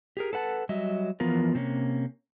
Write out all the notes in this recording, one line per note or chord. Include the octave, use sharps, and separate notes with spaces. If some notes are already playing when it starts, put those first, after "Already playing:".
G4 G#4 A#4
A4 B4 F#5 A5
F#3 G3 D#5 E5
E3 F3 B3 F4 A#4
C3 A#3 C#4